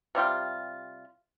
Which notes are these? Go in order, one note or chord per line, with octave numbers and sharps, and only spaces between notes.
C3 G3 F4 G5